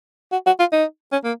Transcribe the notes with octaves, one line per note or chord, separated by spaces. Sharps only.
F#4
F#4
F4
D#4
C#4
A#3